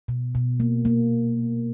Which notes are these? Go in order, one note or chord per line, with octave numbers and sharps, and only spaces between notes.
B2
B2
A#3
A#3